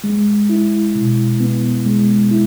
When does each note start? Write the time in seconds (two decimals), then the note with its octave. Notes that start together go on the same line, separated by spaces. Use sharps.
0.04 G#3
0.50 E4
0.95 B2
1.40 B3
1.86 G#3
2.31 E4